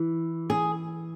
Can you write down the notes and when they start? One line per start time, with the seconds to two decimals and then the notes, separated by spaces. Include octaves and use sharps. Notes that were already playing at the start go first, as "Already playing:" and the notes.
Already playing: E3
0.50 G#4